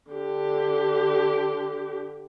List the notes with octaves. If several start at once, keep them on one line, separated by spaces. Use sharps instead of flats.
D3 G4